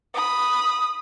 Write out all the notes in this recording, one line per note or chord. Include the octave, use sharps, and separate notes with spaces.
B5 D#6